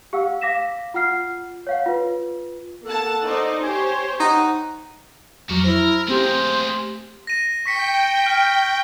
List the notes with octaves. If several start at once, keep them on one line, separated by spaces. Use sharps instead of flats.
G4 F5 F#5 E6
F5 D6 A#6 B6 E7
F4 F#5 F6 C7
C#5 F5 F#5
F4 B4
A#3 A4 F#5 A5
D#4 C5 D5
G4 C5 C#5 G#5
D#4 F#5
F2 F#3 F#4 A#4 D6
E4 A#4 C5
A3 A#3 C4 G4 G#4 C5
A#6 D#7
G5 C#6 B6 C#7
F6